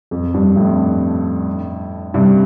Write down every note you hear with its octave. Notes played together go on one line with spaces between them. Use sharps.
F2
G2
F2 A2
G2 C3